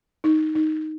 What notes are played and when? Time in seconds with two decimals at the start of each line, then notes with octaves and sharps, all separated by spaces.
0.24 D#4
0.55 D#4